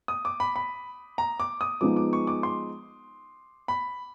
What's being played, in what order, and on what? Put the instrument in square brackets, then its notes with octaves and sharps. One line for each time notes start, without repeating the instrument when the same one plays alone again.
[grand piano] D#6
D6
B5
B5
A#5
D6
D#6
[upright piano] F3 G#3 B3 D#4 [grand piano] D6
[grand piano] D6
C#6
D6
C6
B5